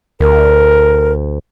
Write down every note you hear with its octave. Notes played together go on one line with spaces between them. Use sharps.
D2 A#4